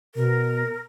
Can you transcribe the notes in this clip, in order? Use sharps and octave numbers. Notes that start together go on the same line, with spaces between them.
B2 A#4